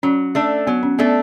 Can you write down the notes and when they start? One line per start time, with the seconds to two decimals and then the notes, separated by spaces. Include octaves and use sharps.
0.03 F#3 C#4
0.35 A3 D4 A4
0.67 F#3 B3
0.83 C#4
0.99 A3 B3 D4 A4